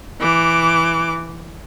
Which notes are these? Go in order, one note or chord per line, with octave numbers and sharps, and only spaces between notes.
E3 D6